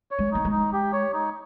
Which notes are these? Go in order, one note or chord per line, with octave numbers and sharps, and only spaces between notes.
C#5
G#3
A#3 D#4
G#3
D#4
G4
C#5
D#4